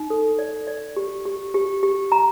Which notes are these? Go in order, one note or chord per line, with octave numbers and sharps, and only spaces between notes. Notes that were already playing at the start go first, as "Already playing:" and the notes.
Already playing: D#4
A4
D5
D5
G4
G4
G4
G4
A#5